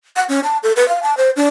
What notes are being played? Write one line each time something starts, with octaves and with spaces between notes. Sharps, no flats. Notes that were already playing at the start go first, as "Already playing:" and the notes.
F#5
C#4
A5
A4
B4
F5
A5
C5
D4